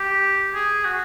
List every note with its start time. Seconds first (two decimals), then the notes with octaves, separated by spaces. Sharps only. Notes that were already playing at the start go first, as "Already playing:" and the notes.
Already playing: G4
0.55 G#4
0.85 F#4